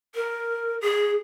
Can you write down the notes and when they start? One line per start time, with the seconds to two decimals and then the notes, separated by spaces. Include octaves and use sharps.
0.15 A#4
0.81 G#4